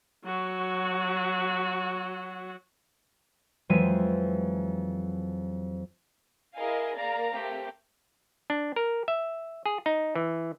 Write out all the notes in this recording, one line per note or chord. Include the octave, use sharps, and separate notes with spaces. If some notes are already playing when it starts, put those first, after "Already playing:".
F#3 F#4
F2 E3 F#3 G#3 E5 D#7
E4 G#4 A#4 D#5 F5 G#5
A#3 A#4 D5 F5 A#5
A3 C4 G4 A#4
D4
A#4
E5
G#4
D#4
E3